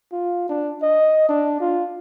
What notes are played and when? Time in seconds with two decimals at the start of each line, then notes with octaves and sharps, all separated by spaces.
0.12 F4
0.49 D4
0.82 D#5
1.29 D4
1.61 F4